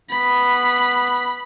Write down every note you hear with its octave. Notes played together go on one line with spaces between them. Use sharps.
B3 B5